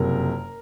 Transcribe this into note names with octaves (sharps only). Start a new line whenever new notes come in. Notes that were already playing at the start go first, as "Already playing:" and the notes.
Already playing: F#1 F2 C3 A#4